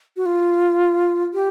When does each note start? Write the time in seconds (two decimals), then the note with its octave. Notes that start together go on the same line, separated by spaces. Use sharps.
0.17 F#4
0.26 F4
1.34 G4